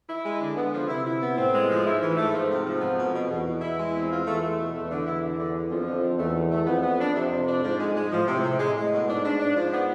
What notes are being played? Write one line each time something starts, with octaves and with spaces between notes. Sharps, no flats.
E4
G#3
D3 D4
B3
F3
C3 E4
E4
B3
A2 C4
G#3
F3
G#2 E4
E3
A3
F3
C3
F3
F2 B3
B2
B2
E2 B2
B2
E4
G#3
C4
F4
E2 A3
A3
B2
E2 A3
D3
E4
D3
D3
D3
F2 F3
D3
D3
E2 A3
B2
A3
F2 B3
B3
D4
F2 C3
C3
D4
G#2 F3
G#3
G#3
A2 F3
C3
C3
A2 G#3
G#3
B2
G#2 D4
D4
D4
F3
B3